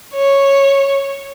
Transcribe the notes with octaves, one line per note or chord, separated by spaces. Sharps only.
C#5